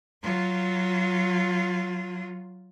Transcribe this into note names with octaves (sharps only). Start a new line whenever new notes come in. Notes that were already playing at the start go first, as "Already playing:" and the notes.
F#3 F4